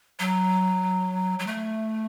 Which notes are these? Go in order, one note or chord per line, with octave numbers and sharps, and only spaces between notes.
F#3
F#3
A3